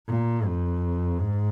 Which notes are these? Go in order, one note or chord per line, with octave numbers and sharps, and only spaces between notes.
A#2
F2
G#2